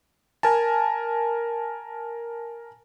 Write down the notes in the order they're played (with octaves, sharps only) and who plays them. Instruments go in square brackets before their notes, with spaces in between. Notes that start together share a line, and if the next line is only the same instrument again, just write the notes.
[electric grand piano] A#4 G#5 A5